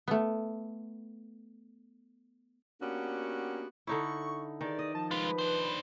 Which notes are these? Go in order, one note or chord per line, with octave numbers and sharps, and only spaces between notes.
A3 B3
A#3 B3 C#4 D4 F#4 G4
D3 D#4 E4 C#6
D#3 E3 G#4 D5
D#5
F3 A5
G#3 F4 B4
D4 C5